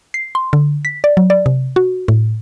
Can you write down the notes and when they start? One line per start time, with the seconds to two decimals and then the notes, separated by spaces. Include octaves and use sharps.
0.14 C7
0.35 C6
0.53 D3
0.85 B6
1.04 D5
1.17 F#3
1.30 D5
1.46 C3
1.76 F#4
2.08 A2